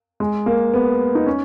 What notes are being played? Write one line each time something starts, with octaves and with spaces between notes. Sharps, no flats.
G#3
A#3
B3
D#4
C#4